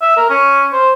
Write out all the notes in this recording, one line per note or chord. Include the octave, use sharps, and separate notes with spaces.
E5
A#4
C#4
C5